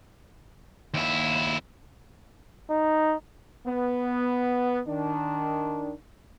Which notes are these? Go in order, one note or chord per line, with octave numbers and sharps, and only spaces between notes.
D#2 E4
D#4
B3
D#3 D4